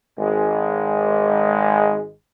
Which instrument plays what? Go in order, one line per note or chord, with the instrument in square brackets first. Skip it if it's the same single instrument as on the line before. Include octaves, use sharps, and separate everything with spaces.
[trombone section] G#1 G#3